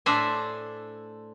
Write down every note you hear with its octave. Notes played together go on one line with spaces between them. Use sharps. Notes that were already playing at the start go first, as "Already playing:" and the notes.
A2 D4 C5 E5 G#5